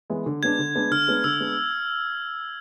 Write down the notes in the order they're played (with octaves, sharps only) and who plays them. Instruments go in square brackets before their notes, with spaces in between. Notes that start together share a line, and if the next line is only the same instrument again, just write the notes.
[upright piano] E3 G#3 B3
D3
[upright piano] G#3 B3 D4 [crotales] G#6
[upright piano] D3
G#3 B3 D4
[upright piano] D3 [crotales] F6
[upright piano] G#3 B3 D4
[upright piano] D3 [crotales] E6
[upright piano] G#3 B3 D4